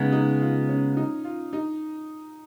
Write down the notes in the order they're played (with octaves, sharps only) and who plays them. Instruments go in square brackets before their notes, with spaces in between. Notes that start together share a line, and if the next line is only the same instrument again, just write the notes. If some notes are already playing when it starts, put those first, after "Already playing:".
Already playing: [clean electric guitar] C#3 G#3 B3 [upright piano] D#4
[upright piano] D#4
F4
C#4
D#4
F4
D#4